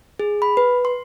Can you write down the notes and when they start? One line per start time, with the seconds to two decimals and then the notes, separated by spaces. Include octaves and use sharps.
0.19 G#4
0.42 B5
0.57 B4
0.85 C6